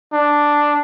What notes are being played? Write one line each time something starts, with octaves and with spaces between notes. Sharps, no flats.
D4